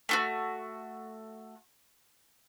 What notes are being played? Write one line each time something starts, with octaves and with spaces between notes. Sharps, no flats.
A3 F4 F#4